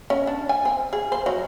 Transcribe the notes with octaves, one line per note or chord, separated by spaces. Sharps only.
C#4
D4
G#5
C4
G#4
C5
F#3